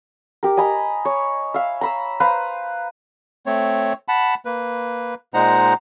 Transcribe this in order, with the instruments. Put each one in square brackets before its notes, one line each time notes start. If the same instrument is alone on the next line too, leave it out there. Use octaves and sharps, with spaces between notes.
[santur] G4 A#4
D#5 G#5 A#5 B5
C#5
E5 F5
A#5 B5 E6
B4 C5 F5 A#5
[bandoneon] A3 C4 C#5
F#5 A5 B5
A#3 B4
A#2 G#3 D#4 C5 F#5 A#5